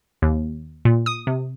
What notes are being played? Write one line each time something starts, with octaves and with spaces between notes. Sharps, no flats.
D#2
A#2
D#6
C3